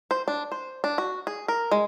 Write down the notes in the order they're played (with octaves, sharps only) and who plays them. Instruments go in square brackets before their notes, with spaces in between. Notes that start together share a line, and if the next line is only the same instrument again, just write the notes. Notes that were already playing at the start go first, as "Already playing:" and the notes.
[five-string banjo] C5
D4
C5
D4
F#4
G#4
A#4
G#3